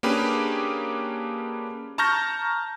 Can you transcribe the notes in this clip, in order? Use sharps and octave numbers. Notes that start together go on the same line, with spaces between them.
A#3 C#4 D4 G4 G#4 B4
A5 A#5 C#6 F6 G6 A#6